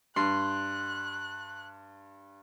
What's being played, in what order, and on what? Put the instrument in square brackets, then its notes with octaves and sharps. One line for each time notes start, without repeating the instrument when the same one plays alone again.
[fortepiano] G2 [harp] C6 [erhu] F#6